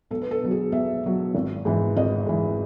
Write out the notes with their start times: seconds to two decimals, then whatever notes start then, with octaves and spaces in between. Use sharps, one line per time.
0.11 B1 A4
0.21 B4
0.31 A4
0.41 B2 F#3
0.51 G#4
0.72 B1 E5
1.04 B2 F#3
1.35 G#1
1.65 G#2 E3
1.97 G#1 D#5
2.26 G#2 E3